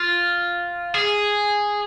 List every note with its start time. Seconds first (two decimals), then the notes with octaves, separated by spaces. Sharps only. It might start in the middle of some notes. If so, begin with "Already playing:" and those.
Already playing: F4
0.94 G#4